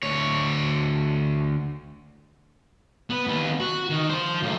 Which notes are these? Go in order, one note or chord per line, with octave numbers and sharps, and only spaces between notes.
D2 C#5
B3
D#2 B3
F#4
D#3
F3 C5
F#2 A2